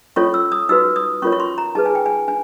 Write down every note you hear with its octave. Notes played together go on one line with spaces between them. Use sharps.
C#4 F4 A4 C#5 C#6
E6
D#6
D#4 F#4 B4 E6
D#6
C#4 F4 A#4 C#5 C#6
C#6
C6
A#5
D#4 G#4 B4 A5
G#5
G5
G#5
D4 G#5